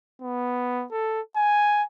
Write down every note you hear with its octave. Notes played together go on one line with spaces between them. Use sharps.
B3
A4
G#5